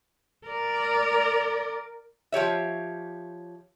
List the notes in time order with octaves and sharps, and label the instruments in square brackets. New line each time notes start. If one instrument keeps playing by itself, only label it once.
[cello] A#4 D5
[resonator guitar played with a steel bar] F3 G4 C#5 E5